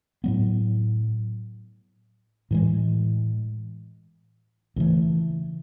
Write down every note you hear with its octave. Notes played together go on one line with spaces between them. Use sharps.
A2 F#3 B3
A2 E3 G#3
D2 C#3 E3 A3